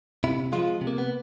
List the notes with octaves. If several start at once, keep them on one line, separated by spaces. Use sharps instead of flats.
C3 E4
F3 G#3 F4
C3
A#3
B3